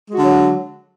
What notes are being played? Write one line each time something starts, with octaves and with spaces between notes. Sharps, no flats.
D3 F#3 G#3 F#4